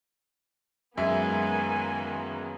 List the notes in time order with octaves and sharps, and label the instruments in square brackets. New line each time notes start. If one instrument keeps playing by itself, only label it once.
[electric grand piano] F#2 G#3 [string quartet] D#3 A#3 B3 [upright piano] E5 [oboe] G#5